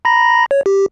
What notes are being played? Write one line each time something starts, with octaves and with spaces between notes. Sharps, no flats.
A#5 B5 A#6
C#5
G4